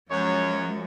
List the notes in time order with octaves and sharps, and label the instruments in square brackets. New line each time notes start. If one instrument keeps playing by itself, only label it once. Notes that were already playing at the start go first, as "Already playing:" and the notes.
[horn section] F#2 [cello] F3 G#3 [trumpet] C#5